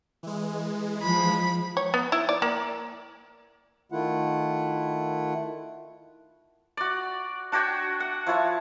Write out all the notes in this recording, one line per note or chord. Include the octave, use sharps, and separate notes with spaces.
E3 G#3
F3 B5
C#5
B3
E4
D5
A#3
D#3 A3 E4 F4 F#5
F#4 D5
D4 F#4 C#5 G5
F#5
F3 E4 C#5 A5